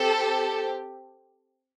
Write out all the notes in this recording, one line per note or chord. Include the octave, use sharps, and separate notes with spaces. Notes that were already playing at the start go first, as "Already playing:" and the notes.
Already playing: C4 G4 A4